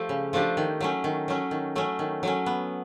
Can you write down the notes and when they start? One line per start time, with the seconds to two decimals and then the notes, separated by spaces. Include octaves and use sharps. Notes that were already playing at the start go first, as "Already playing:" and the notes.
Already playing: F3 A3 G4
0.09 C#3
0.33 F3 A3 D4 G4
0.57 D#3
0.80 F#3 A3 C#4
1.04 D#3
1.28 F#3 A3 C#4
1.51 D#3
1.75 F#3 A3 C#4
1.99 D#3
2.23 F#3 A3 C#4
2.46 B3